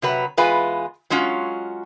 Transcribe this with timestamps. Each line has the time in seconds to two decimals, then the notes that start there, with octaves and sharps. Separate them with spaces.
0.02 C3 F#3 B4
0.37 E2 G#3 F4 B4 G#5
1.10 F#3 G#3 C#4 F4